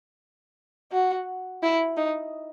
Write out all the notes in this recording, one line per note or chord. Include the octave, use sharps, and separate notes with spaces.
F#4
E4
D#4